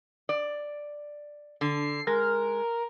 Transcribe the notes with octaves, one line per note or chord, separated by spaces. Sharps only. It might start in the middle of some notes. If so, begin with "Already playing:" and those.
D5
D3 C7
G#3 A#4